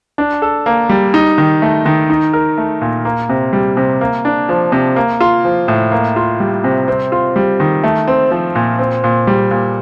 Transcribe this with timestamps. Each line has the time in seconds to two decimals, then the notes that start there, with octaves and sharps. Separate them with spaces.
0.18 D4
0.42 A4
0.66 A#3
0.89 G3
1.14 D#4
1.38 D#3
1.62 A3
1.86 D#3
2.10 D#4
2.33 A#4
2.58 A3
2.81 A#2
3.05 A#3
3.29 C3
3.53 G3
3.77 C3
4.01 A#3
4.25 D4
4.49 F3
4.72 C3
4.96 A#3
5.21 F4
5.44 F3
5.68 A2
5.92 A#3
6.16 F4
6.40 G3
6.64 C3
6.88 C4
7.12 F4
7.36 G3
7.60 D#3
7.84 A3
8.08 C4
8.31 F3
8.55 A#2
8.79 C4
9.04 A#2
9.27 G3
9.51 A#2